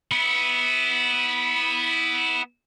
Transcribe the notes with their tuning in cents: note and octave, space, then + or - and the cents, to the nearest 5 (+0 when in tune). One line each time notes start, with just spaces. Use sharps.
B3 +0 E4 -20